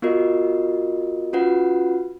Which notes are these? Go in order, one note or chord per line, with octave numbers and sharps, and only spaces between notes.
B3 F4 F#4 A#4 D#5
C#4 F4 F#4 B4 F#5